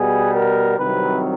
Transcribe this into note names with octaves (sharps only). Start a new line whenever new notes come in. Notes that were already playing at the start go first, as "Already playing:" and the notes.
Already playing: B2 G3 B3 G#4
A#4
C2 C3 D#3 F#3 B4